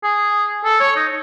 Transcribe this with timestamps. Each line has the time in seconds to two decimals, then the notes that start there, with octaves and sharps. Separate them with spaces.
0.04 G#4
0.65 A4
0.80 C#5
0.96 D#4